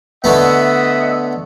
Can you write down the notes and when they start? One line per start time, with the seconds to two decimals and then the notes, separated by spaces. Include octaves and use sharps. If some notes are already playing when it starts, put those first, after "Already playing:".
0.24 D3 A3 B3 D#5 E5 F#5